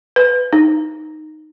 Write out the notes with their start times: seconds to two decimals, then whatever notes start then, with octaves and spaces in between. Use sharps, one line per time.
0.16 B4
0.53 D#4